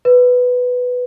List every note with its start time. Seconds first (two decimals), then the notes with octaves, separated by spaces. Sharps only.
0.05 B4